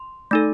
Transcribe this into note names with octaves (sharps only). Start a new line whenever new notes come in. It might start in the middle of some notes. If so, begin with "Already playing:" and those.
Already playing: C6
A3 D#4 A4